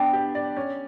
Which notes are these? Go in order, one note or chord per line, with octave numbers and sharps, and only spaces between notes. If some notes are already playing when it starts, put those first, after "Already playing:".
Already playing: B3 D4 G5
G4
D5
C#4